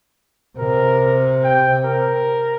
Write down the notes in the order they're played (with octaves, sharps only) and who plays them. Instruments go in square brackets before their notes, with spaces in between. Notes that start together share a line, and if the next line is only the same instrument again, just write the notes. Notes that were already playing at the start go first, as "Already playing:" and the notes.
[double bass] C3 [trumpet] A#4
[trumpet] G5
A#4